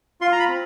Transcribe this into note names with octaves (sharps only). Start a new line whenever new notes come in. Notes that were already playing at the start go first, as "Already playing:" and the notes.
F4 C6
A#5
B5
C4